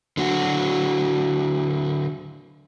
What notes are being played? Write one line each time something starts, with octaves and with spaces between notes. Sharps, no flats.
D3 F#3 F#4